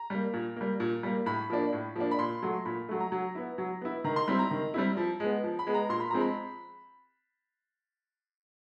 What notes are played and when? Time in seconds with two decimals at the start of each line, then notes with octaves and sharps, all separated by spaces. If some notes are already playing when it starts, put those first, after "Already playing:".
Already playing: A#5
0.10 G3 A#3
0.34 A#2
0.56 G3 A#3
0.80 A#2
1.03 G3 A#3
1.26 A2 B5
1.50 F3 A#3 D4
1.73 A2
1.96 F3 A#3 D4
2.11 B5
2.19 A#2 C6
2.42 F#3 A3
2.65 A#2 B5
2.89 F#3 A3
3.00 A#5
3.12 F#3
3.35 B3 E4
3.58 F#3
3.82 B3 E4
4.04 D#3 A#5
4.16 C6
4.28 G3 C4 E4 B5
4.39 A#5
4.51 D#3
4.74 G3 C4 E4
4.97 F3
5.20 G#3 B3
5.44 F3
5.59 B5
5.67 G#3 B3
5.74 A#5
5.89 A#2 C6
6.00 B5
6.10 F3 G#3 C4 A#5
6.20 B5